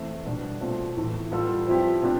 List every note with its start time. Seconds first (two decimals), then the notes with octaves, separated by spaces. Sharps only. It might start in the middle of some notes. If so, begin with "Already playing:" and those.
Already playing: E3 A3 C4 E4
0.25 B2 G3 B3 D4
0.60 B2 A3 C4 F4
0.97 A2 E3 A3
1.32 G3 B3 F4 A4
1.67 F3 C4 E4 G4
2.02 C3 F3 B3 D4 G4